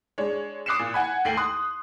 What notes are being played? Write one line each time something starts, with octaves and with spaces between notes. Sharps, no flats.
G#3 D4 C#5
D6 D#6 F#6 C7 C#7 E7
A#2
F#5 G#5 B5
D#2 A3 G5 C7 F#7
C6 D#6 F#6